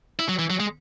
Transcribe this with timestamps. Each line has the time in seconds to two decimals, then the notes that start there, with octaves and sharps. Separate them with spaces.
0.19 E4
0.29 F#3
0.39 E3
0.50 F#3
0.60 G#3